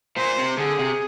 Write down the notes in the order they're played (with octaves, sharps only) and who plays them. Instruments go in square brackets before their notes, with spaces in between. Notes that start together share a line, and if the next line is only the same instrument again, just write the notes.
[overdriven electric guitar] A#2 [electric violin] C5
[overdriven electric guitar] C3
[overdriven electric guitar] D3 [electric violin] G#4
[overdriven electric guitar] C3